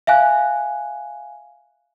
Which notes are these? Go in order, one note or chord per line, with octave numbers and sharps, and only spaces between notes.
E5 F5 G#5 F#6